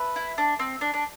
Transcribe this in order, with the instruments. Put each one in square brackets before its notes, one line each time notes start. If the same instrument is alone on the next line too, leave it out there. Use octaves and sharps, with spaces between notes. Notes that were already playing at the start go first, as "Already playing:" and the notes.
Already playing: [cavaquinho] B4 E5 A5
[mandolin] E4
D4
C4
D4
D4